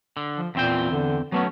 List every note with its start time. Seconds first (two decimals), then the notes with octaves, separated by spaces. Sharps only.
0.17 D3
0.38 F3
0.55 E2 A#2 C4 G5
0.91 D3
1.32 F#3 A3 B3 C#4